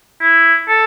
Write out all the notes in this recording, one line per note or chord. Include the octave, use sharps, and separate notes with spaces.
E4
A4